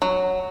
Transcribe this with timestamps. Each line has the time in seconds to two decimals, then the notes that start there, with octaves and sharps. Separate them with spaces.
0.02 F#3